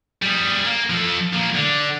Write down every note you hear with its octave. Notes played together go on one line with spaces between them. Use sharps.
G3 G#4
A#3
F3 A4
F3 A#3
D3